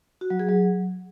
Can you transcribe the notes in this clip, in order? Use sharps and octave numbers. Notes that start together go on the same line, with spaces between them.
F#4
F#3
G#4
F#3